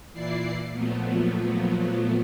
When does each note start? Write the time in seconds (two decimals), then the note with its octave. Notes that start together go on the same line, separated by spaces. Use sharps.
0.13 A#2 E3 E4 D5 C7
0.72 A#2 F3 F#3 A3 B3